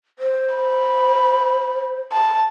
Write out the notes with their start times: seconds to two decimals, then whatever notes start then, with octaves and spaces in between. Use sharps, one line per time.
0.19 C5
0.55 B5
2.13 A5